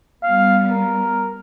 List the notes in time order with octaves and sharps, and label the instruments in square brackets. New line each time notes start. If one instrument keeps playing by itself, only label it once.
[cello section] G3 B3 [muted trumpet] F5
[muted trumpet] A#4